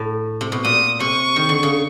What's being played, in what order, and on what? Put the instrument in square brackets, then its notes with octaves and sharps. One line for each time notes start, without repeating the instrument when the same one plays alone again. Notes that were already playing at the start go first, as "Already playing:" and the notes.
Already playing: [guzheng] A2
C3
B2
[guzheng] A#2 [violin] D#6
[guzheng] C3 [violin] C#6
[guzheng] D#3
D3
C#3